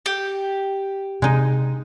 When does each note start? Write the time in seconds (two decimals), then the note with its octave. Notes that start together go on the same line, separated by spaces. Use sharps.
0.06 G4
1.22 C3 G#3 D#4